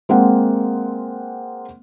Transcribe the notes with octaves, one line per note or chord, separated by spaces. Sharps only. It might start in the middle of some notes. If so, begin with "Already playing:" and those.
G#3 A#3 C4 F#5